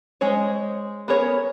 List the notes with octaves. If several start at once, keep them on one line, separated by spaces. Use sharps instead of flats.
G#3 G#4 C5 C#5
B3 G#4 A#4 C#5